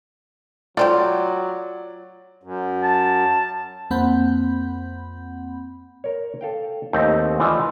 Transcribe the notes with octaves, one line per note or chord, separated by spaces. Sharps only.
F#3 A3 C4 F4 G4 D5
F#2
A5
F2 A#3 C4 F#5 B5 G6
A#4 C#5
A4 F5 G5
D#2 A3 C4 D#4 G4
E3 F3 A3 D5 D#5